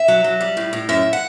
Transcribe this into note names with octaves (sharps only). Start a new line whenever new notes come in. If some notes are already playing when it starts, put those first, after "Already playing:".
Already playing: E5
F#3
F#3
G3
A2
A2
F#2 E5
F#5